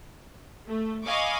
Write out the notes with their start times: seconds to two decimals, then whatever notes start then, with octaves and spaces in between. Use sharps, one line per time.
0.67 A3
1.05 D#5 F5 G#5 B5 C#6 D6